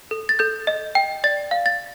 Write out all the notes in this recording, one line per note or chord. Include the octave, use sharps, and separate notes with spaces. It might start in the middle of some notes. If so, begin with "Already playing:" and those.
A4
A6
A4 G6
D#5
G5
D5 A6
F5
A6